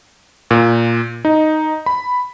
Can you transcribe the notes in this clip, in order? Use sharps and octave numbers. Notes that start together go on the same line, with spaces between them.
A#2
D#4
B5